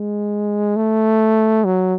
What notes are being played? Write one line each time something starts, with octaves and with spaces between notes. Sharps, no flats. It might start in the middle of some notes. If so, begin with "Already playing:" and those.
Already playing: G#3
A3
F#3